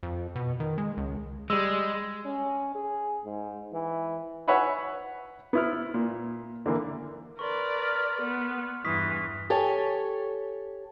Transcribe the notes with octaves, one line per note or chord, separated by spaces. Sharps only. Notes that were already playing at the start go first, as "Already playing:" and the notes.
F2
B2
D#3
G#3
C#2
G3 G#3 E6
C#4
G#4
G#2
E3
B4 C#5 E5 F#5 G#5 B5
B3 E4 F6
A#2
D3 E3 A#3
A#4 B4 D5 C6 C#6
F6
B3
E2 G2 E3 C#6 D#6 B6
G4 A4 C#5 G#5